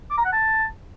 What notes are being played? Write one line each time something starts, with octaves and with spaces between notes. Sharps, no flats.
D6
A#5
F#5
A5